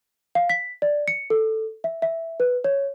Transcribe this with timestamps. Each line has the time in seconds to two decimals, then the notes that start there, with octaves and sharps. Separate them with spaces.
0.35 F5
0.50 B6
0.82 D5
1.08 C#7
1.30 A4
1.84 E5
2.02 E5
2.40 B4
2.64 C#5